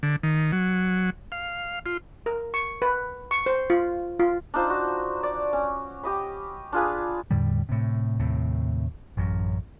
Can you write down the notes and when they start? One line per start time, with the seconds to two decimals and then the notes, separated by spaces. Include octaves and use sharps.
0.03 D3
0.23 D#3
0.52 F#3
1.32 F5
1.86 F4
2.26 A#4
2.54 C#6
2.82 B4
3.31 C#6
3.46 C5
3.70 F4
4.19 F4
4.54 D4 D#4 F4 C5
4.70 F#4
5.23 D5
5.53 C#4
6.03 G4 D#5 B5
6.73 D4 F4 G#4 B4
7.31 E2 A2 D3 G3
7.69 A2 C3
8.19 D#2 A2 C3
9.17 A1 F#2